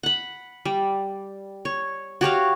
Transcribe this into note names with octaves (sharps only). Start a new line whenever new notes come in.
F#5 B5
G3
C#5
F#4 G4 C#5 F5